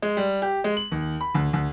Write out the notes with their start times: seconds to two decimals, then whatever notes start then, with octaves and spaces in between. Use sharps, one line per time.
0.02 G#3
0.17 G3
0.42 G4
0.64 G#3
0.77 F#7
0.92 D#2
1.21 B5
1.35 D2
1.53 D2